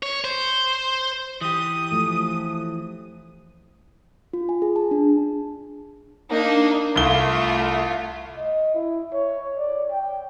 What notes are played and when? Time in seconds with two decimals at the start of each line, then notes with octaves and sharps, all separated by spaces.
0.03 C#5
0.24 C5
1.41 E3 G4 D#6
1.92 F3 A3
4.33 F4
4.49 G#5
4.62 G#4
4.76 A5
4.91 D4
6.32 A#3 D4 D#4
6.96 C2 A3 F4 G7
8.36 D#5
8.74 E4
9.14 C#5
9.58 D5
9.91 G5